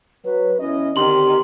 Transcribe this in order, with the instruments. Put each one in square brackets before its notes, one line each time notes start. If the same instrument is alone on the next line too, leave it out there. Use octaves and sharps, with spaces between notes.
[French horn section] F#3 [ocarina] B4
[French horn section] E2 E4 D#5 [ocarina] C#4
[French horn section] D3 C4 [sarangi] D#3 [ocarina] G4 [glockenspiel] C6 F#7